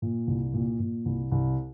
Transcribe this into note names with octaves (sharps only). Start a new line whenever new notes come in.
A#2
C2
A#2
A#2
C2
C2